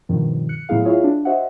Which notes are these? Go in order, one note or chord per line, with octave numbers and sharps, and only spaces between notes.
G2 B2 D#3 F3
F#6 C#7
A2 F#3 B3 E4 G#4 F5
E4 F4 G#4 C#5 E5 F5
D4
F#4 C5 D#5 E5 F#5